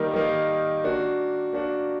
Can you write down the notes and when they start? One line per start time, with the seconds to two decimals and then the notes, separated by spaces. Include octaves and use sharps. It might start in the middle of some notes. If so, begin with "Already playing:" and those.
Already playing: D#3 G3 A#3 D#4
0.14 D#3 G3 A#3 D#4
0.84 A#3 D4 F#4
1.53 A#3 D4 F#4